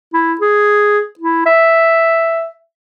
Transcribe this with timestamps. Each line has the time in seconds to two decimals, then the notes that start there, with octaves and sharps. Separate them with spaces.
0.13 E4
0.41 G#4
1.19 E4
1.46 E5